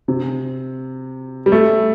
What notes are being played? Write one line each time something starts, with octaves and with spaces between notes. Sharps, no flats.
C3
G3
A3